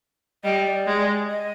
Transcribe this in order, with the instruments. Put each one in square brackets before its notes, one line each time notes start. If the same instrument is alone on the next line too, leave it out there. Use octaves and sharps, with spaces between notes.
[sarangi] G3 [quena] D#5
[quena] D5
[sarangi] G#3
[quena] D#5